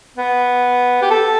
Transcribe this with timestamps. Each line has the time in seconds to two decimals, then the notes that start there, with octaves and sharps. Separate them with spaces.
0.17 B3
1.02 G4
1.10 A4